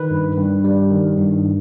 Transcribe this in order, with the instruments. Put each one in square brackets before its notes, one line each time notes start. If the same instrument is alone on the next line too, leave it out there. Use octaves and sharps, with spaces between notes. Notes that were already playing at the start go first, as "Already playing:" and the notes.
Already playing: [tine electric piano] D#3 B4
G2
G2
G3
D#3
G2